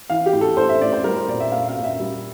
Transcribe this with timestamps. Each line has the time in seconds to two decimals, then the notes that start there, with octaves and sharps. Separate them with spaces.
0.10 E3 F5
0.26 G4
0.33 A2
0.41 A4
0.57 A3 C5
0.69 E5
0.80 A2 D5
0.92 C5
1.04 G3 A#4
1.17 C5
1.28 A#2 D5
1.40 E5
1.52 A#3 F5
1.68 F5
1.76 A#2
1.84 E5
1.99 G3